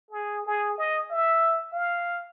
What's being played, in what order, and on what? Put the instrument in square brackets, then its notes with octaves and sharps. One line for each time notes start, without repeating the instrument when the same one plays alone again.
[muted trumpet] G#4
G#4
D#5
E5
F5